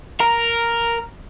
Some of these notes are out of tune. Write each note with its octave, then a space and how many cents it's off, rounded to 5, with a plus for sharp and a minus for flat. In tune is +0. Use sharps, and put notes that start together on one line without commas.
A#4 +0 A#5 +0